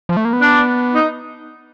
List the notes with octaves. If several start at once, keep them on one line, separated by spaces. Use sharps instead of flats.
F3
A3
A#3
B3
D4
D#4